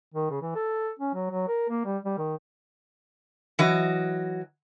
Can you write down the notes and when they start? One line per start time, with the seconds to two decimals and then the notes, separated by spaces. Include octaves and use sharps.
0.14 D#3
0.30 C#3
0.41 E3
0.55 A4
0.99 C#4
1.14 F#3
1.30 F#3
1.48 A#4
1.69 A#3
1.85 G3
2.05 G3
2.18 D#3
3.59 E3 F#3 D#5